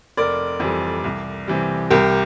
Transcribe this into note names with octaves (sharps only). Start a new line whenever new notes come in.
F1 A#4 D5
F2 E3 G3
C2
C3 E3 G3
C2 G4 A#4